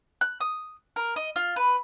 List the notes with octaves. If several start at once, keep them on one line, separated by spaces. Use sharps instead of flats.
F#6
D#6
A#4
D#5
F4
B4